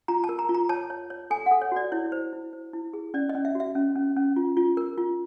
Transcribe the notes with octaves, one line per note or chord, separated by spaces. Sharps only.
F4 A#5
A5
A#4
A#5
F4
A#5
C#5 A5
C#5
C#5
A4 G#5
F#5
A4
C#5
F#4 D5
E4 C#5
C5
E4
C5
E4
G#4
C#4 D5
D#5
C#4
E5
F#4 E5
C#4
C#4
C#4
F4
F4
A#4
F4